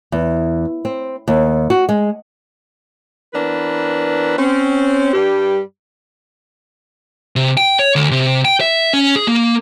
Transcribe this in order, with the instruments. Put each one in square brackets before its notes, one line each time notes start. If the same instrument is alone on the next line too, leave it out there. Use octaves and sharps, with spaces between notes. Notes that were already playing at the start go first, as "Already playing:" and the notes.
[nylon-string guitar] E2
C4
D#2
F#4
G#3
[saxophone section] E3 B3 C4 D4 A#4 B4
C4 C#4
G2 G3 G4
[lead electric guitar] C3
G5
C#5
D2
C3
G5
E5
C#4
G#4
A#3